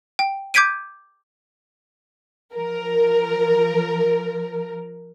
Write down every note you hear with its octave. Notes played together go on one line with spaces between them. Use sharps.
G5
D6 G6 G#6 B6 D7 D#7
F3 A#4